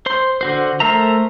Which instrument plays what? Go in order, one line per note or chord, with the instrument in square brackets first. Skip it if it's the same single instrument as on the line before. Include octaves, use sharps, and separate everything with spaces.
[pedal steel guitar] C5 C6
D3 F#4 C5
A3 A#4 C5 E5 A#5